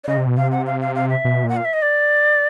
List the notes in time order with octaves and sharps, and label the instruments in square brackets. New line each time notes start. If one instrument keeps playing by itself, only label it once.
[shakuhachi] D5
[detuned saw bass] C#3 [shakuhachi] D#5
[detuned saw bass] C3
B2
[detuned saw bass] C3 [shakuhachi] F5
[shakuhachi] F#5
F5
F5
F5
E5
[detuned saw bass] B2
A#2
[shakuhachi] F#5
F5
E5
D#5
D5